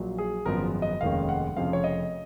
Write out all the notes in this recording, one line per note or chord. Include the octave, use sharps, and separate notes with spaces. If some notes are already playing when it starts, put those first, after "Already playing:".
Already playing: A#1 A#2 F#3
G#4
G#1 F#2 F3 G#3 B3 A#4
D#5
F1 D#2 D#3 G#3 C#4 F5
F#5
F1 F2 C#3 F3 F5
C#5
D#5